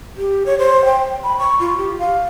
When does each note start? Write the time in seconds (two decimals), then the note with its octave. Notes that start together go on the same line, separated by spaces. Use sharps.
0.17 G4
0.46 C#5
0.59 C5
0.85 G5
1.24 B5
1.38 C#6
1.60 F4
1.78 G4
1.99 F5